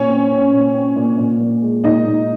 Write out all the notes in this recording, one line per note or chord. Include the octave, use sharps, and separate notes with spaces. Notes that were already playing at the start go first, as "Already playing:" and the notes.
Already playing: A#2 C#4 C#5
C4
C4
A#2
C4
A#2
A#2
A#2
G#3
A#2 D#4 D#5
A#2